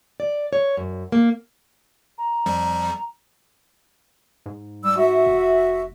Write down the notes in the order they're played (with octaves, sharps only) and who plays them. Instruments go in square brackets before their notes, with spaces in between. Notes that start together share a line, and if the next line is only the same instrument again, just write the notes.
[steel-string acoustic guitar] D5
C#5
F#2
A#3
[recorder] A#5
[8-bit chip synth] F2 F3 G3
[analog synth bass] G#2
[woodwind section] G3 E6
F#4 E5
[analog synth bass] F1